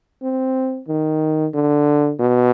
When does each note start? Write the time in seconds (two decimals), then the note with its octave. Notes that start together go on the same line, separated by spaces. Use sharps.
0.22 C4
0.88 D#3
1.54 D3
2.19 B2